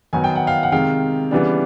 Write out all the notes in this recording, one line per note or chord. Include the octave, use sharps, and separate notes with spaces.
D#3 F#3 B3 D#4 G#5
G5
F#5
F5 G5
F#5
C3 D#3 G#3 F5 G5
C#3 E3 G3 B3 D4